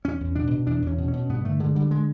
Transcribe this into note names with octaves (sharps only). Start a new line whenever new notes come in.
E2 C#4
E2
B2 D4
B2
E2 D4
E2
C#4
B2
C#4
B2
G2 B3
D3 A3
D3 G#3
D3 G3
G#3